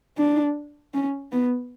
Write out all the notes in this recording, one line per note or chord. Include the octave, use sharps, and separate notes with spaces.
D4
C#4
B3